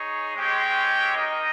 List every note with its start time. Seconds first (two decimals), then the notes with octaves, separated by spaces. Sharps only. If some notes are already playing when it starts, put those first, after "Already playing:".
Already playing: D#4 G#4 C#5
0.36 G#3 C4 G4 C#5 G5
1.14 D#4 A#4 D#5